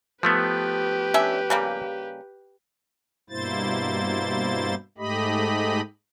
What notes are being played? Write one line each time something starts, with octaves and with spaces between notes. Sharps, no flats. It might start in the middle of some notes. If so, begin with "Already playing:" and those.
F3 A3 B3 G4 B4
C#4 D4 E5
C#3 G3 A#3
G2 B2 A#3 E4 C5 A6
G#2 A3 G4 D#5 B5